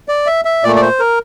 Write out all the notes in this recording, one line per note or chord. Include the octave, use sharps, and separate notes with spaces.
D5
E5
E5
A#2 A3 D5
D5
C5
A#4